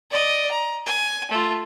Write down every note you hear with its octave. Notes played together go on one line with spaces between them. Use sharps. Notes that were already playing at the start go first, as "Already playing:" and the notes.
D5 D#5
A#5
G#5
A3 F4